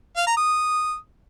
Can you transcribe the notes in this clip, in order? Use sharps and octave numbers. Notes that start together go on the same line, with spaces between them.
F5
A#5
D#6